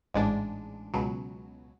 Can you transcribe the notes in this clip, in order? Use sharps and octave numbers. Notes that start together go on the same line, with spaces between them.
A1 G#2 G#3 D4
C#2 B2 F#3